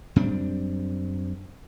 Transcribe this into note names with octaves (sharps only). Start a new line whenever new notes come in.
F#2 G3 C4 D4